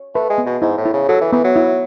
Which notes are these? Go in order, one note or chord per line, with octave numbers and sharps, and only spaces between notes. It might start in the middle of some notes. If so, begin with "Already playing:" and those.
Already playing: C#5
A3 B4
G#3
B3
B2
G#2 E4
A2
E4
C#3
F#3 A4
E3
E3 B3
F#3
E4